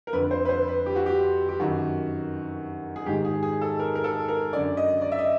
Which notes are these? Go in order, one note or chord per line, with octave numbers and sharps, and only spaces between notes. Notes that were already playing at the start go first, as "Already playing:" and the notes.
A#4
F2 D3 B4
C5
B4
C5
B4
G4
F#4
G4
G4
F#2 D#3 F#4
G#4
G#2 D#3 G4
G#4
G#4
A4
A#4
A#4
A4
A#4
F#2 D3 D5
D#5
D5
E5
D#5